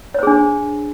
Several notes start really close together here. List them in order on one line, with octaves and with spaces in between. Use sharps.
C#5 C5 G#4 D4